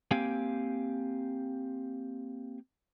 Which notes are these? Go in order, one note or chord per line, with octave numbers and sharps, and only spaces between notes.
A#3 C4 G4 F5 G5 G#5